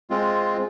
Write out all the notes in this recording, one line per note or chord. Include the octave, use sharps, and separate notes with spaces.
G#3 C4 F4